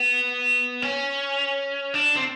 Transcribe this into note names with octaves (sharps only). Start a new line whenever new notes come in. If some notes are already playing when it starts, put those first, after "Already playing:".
Already playing: B3
C#4
D4
C4